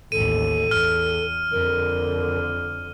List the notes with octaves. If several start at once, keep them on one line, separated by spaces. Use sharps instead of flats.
A1 D#2 A4 D#7
E2 F6
F2 D3 A#4